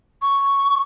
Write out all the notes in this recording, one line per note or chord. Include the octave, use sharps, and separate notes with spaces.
C#6